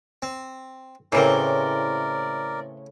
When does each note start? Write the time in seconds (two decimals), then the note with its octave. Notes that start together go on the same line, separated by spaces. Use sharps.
0.22 C4
1.12 A2 C#3 E3 A#3 C4 A#4 D5